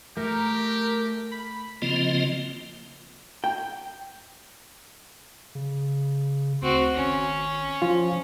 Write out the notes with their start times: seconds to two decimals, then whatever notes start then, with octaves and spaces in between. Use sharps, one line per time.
0.17 A3 G4 A#4
1.31 B5
1.82 C#3 F3 A#3 C4 F4 D#5
3.44 G5
5.55 C#3
6.62 D2 C4 F#4
6.95 G#1 C#4
7.82 F3 F4